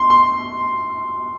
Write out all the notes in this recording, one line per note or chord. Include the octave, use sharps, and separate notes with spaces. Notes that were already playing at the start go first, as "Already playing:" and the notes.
Already playing: C6
C6